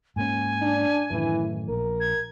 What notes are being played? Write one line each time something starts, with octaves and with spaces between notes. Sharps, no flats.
G#2 A#3 C#4 G#5
D4
F#2 A2 D#3 E3
A#1 A#4
G#6